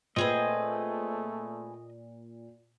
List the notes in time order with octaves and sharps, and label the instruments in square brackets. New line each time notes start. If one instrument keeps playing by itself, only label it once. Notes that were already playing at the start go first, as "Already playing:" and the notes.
[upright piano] A#2 [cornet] A3 [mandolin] C4 G#4 B4 [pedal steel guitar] D#5